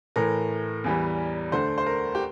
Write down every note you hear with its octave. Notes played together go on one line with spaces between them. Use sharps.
A2 E3 A3 A#4
E2 E3 G3
D2 D3 A3 C5
C5
A#4
G4